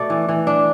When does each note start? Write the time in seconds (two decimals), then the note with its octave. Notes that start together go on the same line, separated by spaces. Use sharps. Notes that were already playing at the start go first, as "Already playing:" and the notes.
Already playing: B2 A3 D5
0.10 E3
0.29 E3
0.47 D4